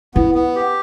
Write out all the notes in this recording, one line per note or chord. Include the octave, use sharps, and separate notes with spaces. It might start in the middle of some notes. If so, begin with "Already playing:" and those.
B3 E4
B3
G4